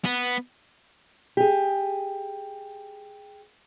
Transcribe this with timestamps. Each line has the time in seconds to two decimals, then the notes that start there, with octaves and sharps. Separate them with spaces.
0.05 B3
1.37 G4 G#4